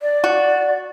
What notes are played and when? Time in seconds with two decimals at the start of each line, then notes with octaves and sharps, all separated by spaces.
0.02 D5
0.24 F#4